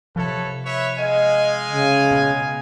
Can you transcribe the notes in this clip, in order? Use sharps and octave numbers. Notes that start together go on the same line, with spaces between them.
C3 F3 A4 B4 C#5
B4 C#5 E5
G#3 D#5 F5 G#5
C#3
B2